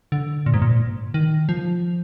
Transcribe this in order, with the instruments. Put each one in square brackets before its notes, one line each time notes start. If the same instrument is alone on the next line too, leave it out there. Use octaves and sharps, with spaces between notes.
[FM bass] D3
A#2
G#2
A#2
D#3
F3